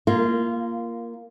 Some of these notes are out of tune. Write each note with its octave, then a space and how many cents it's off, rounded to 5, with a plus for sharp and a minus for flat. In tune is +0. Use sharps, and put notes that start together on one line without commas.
A#3 +0 F4 -20